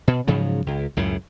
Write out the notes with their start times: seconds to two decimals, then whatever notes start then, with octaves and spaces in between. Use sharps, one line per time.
0.08 B2
0.27 G#2 C#3 F3 F#3
0.66 C#2
0.97 C#2 F#2 A2 C#3